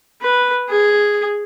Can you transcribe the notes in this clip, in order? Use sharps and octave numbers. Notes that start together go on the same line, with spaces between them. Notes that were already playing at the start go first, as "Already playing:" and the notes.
B4
G#4